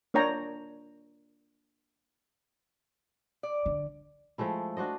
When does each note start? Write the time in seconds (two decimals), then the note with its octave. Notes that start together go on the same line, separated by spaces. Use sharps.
0.14 A#3 D4 C#5 G5 A#5
3.43 D5
3.66 D3
4.38 F3 G#3 A3 E4
4.77 D4 F#4 C5 D#5